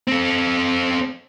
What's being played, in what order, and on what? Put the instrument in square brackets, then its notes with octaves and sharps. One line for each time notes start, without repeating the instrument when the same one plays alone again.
[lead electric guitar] C4 A4